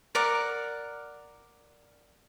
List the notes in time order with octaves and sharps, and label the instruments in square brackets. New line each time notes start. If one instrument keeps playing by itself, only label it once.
[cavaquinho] A#4 D5 F#5